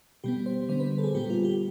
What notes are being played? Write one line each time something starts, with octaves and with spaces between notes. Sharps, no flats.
B2 G3 B3 G4
C5
D3 G3 B3 C5
B4
A4
G#4
A#2 G3 B3 G4
F4
G4